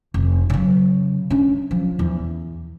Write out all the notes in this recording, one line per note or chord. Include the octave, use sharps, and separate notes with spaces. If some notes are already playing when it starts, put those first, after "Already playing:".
F1
C#3 F#3
C#4 D4
F3
E2